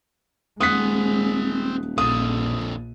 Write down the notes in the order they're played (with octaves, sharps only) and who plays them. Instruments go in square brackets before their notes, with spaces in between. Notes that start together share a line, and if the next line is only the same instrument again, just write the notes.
[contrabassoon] D#1 [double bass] G#3 [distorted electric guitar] C4 F#5 [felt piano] D#6 F#6 B6
[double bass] A#1 [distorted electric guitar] F2 D3 [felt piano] D#6